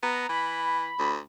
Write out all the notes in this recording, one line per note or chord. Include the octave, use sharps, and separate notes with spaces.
B3 A#5
E3 B5
D2